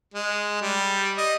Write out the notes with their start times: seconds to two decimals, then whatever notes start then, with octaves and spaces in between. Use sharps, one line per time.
0.14 G#3
0.62 G3
1.18 D#5